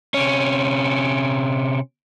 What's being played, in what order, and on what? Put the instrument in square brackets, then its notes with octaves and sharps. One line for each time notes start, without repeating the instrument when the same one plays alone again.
[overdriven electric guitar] C3 C#4